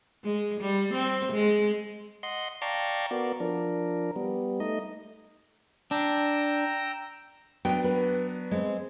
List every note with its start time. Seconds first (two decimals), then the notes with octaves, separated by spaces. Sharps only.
0.24 G#3
0.61 G3
0.94 C4
1.33 G#3
2.23 D#5 F#5 C6
2.62 D5 F5 G5 A5 A#5 C#6
3.11 B3 F#4 A#4 D5
3.40 F3 D4 A#4
4.16 G3 B3
4.60 A3 D#4 D#5
5.91 D4 G5 A#5 E6
7.65 F#3 B3 D4 G5
7.84 B4
8.51 G#3 C4